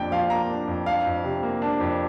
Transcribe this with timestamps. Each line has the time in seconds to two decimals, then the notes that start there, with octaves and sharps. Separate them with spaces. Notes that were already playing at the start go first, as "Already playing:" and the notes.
Already playing: F2 A#2 D4 G5
0.11 F3 F5
0.30 A#3 A#5
0.50 D4
0.67 F2
0.86 D4 F5
1.06 F2
1.24 C3
1.43 A#3
1.62 D4
1.80 F2